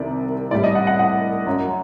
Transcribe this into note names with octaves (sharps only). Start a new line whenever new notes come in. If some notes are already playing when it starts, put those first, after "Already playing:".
Already playing: C2 C3 D#3 D5
A2 G3 D5
D#5
F#5
F#5
F#5
F#2 F#3